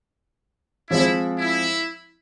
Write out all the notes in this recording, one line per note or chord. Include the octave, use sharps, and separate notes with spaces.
F3 G#3 C4 E4 F4
E4